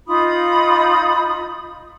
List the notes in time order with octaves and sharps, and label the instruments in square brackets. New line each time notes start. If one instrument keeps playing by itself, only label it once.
[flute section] D#4 F4 B5 D#6